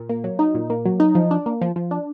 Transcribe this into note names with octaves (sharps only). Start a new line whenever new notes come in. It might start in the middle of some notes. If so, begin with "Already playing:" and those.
Already playing: A#2
A#3
F#3
D#4
A#2
A#3
F#3
D#4
F3
D4
A#3
F3
F3
D4